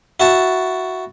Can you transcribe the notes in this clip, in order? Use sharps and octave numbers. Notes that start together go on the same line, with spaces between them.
E4 F#4 A5